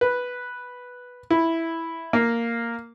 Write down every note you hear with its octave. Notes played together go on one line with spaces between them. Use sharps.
B4
E4
A#3